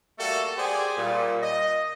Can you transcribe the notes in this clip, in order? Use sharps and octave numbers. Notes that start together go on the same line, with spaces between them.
G3 A3 A#3 F#4 A4
G4 G#4 C5 D5 G#5
A#2 G3
D#5